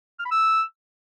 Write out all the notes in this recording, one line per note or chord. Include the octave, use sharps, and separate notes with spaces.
F6
B5
E6